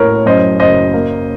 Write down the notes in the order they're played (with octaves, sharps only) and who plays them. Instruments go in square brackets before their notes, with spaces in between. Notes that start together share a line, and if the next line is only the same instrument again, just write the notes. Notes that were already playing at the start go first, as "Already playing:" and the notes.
Already playing: [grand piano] A2 A#3 A#4 C#5
F#2 C5 D#5
F#1 C5 D#5
A#3